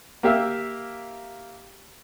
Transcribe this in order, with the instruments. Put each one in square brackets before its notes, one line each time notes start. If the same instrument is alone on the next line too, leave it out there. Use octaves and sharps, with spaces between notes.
[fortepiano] A#3 G4 E5 F5 E6